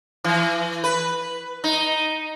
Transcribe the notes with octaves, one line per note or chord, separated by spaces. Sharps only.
E3
B4
D#4